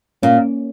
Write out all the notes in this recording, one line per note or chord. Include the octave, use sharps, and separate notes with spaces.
A#2 A#3 C#4